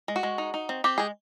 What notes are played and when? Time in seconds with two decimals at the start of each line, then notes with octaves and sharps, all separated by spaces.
0.08 G#3
0.16 F#4
0.23 G#3
0.38 D#4
0.54 D#4
0.69 C4
0.84 C4 G4
0.98 G#3 G#4